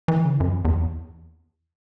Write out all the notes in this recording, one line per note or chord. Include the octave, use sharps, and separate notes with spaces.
E3
C#3
F#2
E2